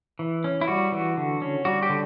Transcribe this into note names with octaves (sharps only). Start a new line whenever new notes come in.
E3
C#4
E4
G3 F#4
E3
D3
C#4
G3 F#4
G4
D3